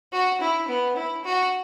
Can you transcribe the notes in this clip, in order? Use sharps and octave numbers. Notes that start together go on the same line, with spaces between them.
F#4
E4
B3
E4
F#4